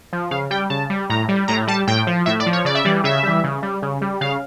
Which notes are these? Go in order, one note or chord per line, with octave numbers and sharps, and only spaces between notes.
F3
C#3 F5
G3 G5
C#3 A5
G3
A2 A#5
G3
A2 A#5
G3 A5
A2 G5
F3
A2 E5
D5
F3
C#5
C#3 D5
E5
E3 G3 D5
C#3 E5
E3 G3
C#3
G3
C#3
G3
C#3 F5